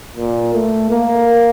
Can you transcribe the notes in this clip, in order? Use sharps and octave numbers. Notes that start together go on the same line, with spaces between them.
A#2
A3
A#3